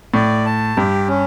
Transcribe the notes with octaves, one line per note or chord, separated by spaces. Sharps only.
A2 D5
A5
G2 G4
C#4